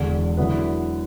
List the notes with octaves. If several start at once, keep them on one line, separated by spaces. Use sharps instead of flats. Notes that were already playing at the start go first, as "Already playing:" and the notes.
Already playing: E1 E2 D3
D3 F#3 B3 E4 B4